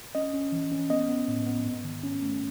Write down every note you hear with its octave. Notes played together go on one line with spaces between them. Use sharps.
C#4 D#5
C#4
E3
C#4
B3 D#5
B3
A2
B3
G#2
D#3
C#4
A3